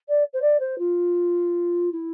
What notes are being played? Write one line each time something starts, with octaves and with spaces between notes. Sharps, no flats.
D5
C5
D5
C5
F4
E4